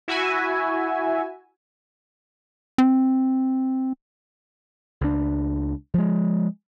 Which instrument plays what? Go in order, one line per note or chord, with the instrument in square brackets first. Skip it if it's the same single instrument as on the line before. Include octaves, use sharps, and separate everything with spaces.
[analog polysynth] E4 F#4 E5 G#5
[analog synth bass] C4
[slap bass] C#2 D4
F3 G#3